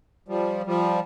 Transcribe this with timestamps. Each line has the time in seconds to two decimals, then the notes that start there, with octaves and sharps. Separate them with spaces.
0.28 F3 G3
0.66 F3 G3